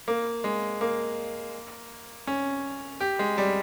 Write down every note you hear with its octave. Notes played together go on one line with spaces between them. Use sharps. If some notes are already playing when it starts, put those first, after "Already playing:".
A#3
G#3
A#3
C#4
G4
G#3
G3